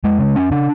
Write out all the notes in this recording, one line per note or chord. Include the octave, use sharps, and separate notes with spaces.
F2 G#3
C#3
F2 C#4
C#3 D4